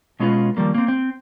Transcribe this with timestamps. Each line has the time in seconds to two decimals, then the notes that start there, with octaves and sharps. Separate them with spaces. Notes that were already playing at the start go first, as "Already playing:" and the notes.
0.20 B2 G#3 C#4 F4 A#4 B4
0.57 D#3 F3 G3 A#3
0.74 A#3 C4
0.88 C4